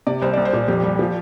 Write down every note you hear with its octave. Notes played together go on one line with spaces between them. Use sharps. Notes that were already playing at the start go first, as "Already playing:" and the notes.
C3 D5
C2 C5
C2 D5
C5
A#2
F2 G4
G3
F3